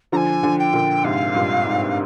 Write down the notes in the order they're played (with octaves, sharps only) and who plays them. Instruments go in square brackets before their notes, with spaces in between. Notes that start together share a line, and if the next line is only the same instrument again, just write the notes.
[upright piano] D3 F3 [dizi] G#5 A#5
[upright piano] D3 F3
[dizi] G5
[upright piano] A#2 D3
[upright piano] G#2 C3 [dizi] F5
[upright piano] G2 A#2
G#2